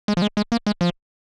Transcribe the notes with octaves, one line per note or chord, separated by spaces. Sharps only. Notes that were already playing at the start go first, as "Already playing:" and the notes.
G#3
F3
G#3
G#3
A#3
G#3
F3